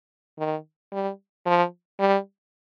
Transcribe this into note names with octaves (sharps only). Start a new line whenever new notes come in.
D#3
G3
F3
G3